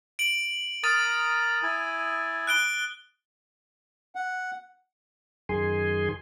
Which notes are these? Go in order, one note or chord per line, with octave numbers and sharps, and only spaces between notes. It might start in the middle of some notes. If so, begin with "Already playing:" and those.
D7 F#7
A#4 A#5 D#6 A6 D#7
E4 G#5
F#6 D7 G7
F#5
F#2 D#3 G#4 G#5 C6